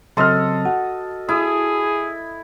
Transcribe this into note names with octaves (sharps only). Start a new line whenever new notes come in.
C#3 F#3 C4 A4 D#5 C6 F6
F#4 F#5
E4 G#4 D#6